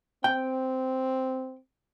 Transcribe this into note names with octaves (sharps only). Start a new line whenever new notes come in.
C4 G5